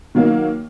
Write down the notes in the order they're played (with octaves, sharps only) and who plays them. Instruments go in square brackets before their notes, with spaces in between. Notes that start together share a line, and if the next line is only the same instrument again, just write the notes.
[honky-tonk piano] D#3 F#3 A#3